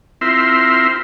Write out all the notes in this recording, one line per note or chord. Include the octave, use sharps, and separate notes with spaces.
C4 E4 F4 A#4 E5 C6